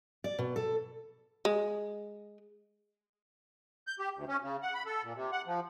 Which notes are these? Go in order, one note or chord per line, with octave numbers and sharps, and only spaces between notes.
D5
B2
A4
G#3
G6
G4
D2
C#4
C#3
F#5
B5
A4
A#2
C3
F#5
F3